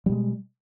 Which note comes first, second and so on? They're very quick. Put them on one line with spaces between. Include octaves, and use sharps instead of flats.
G3 B2 G#3